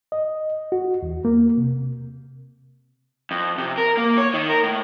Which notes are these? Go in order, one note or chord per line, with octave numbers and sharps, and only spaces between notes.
D#5
F#4
E2
A#3
C3
F2
C3
A#4
A#3
C#5
D#3
A#4
A2